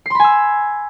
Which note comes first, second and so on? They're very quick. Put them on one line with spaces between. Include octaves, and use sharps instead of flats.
C7 C6 B5 G#5 E6